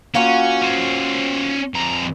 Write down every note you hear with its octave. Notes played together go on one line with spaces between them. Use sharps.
A#3 C#4 F4 F#4
C#4 C5
F2 A#5